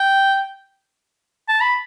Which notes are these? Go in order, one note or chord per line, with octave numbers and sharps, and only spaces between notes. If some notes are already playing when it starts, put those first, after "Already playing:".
Already playing: G5
A5
B5